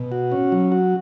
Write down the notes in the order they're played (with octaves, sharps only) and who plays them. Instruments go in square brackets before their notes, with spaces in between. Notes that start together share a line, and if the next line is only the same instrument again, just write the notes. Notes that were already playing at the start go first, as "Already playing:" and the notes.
Already playing: [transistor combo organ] B2
F#4
C#4
F#3
F#4